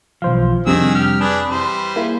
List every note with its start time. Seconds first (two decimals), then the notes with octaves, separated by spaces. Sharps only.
0.22 B1 E3 F3 C5 F5
0.67 F2 C3 D#3 G3 D4 G#4 E6
0.95 G4 F6
1.21 D4 G#4 B4 A5
1.50 E3 G3 C5
1.96 A#3 E4 G#4